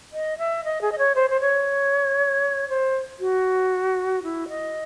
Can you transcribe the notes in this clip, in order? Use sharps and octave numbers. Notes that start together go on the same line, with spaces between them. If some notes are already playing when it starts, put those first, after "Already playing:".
D#5
E5
D#5
G#4
D#5
C#5
C5
C5
C#5
C5
F#4
E4
D#5